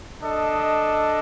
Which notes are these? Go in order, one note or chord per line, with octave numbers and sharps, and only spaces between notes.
D4 A4 D#5